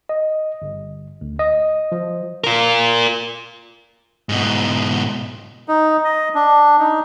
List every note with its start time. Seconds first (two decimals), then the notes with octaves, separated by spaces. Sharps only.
0.09 D#5
0.62 G1
1.21 D2
1.39 D#5
1.92 F3
2.44 F4 A#4
4.29 G#2 B2
5.68 D#4
6.05 D#5
6.35 D4
6.79 D#4